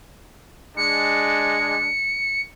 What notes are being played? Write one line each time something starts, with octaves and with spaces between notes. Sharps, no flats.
G#3 D4 C#7